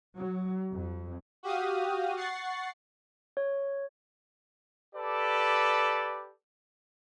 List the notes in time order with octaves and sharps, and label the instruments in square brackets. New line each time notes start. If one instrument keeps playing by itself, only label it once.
[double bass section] F#3
F2
[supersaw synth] F#4 G4 F5 D#6
F#5 C#6 A6 C7
[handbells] C#5
[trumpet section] G4 A4 B4 D5